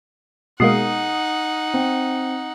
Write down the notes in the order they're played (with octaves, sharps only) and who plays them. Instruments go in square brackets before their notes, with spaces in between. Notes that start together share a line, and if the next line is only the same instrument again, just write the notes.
[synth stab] B2 G#3 A#3 [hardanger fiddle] D#4 F#5 [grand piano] D#6 C7
[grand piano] C4